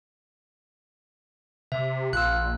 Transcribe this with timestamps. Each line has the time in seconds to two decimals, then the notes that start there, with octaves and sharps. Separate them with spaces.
1.72 C3 E5
2.13 A#1 F4 E6 F#6